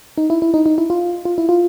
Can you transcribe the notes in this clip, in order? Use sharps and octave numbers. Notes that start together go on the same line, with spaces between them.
D#4
E4
E4
D#4
D#4
E4
F4
F4
E4
F4